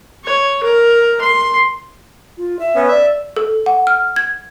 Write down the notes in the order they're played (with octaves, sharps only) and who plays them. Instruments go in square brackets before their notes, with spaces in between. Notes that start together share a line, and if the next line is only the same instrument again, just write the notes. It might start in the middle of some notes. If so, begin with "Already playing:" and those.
[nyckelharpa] C#5
A#4
C6
[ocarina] F4
E5
[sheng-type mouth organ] B3 C#4
[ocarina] D5 [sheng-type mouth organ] E5
[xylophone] A4
F#5
F6
G#6